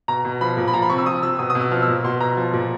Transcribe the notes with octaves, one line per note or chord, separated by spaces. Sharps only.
B2 A#5
B2
F3 B5
A#2
B5
F3 A#5
B5
C3 C#6
E6
F3 D#6
C3 E6
B2 D#6
D#6
B2
E6
F3 F6
E6
A#2
B2 C6
B2 A#5
F3
A#2